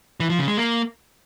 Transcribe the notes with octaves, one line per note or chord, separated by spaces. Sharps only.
E3
F3
C#3
G#3
A#3